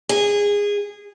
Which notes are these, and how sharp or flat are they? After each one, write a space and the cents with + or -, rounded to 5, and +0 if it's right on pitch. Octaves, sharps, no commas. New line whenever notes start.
G#4 -20